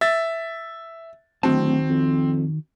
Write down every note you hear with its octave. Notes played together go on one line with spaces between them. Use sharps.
E5 A6
D1 D#3 C4 F#4 A5
F2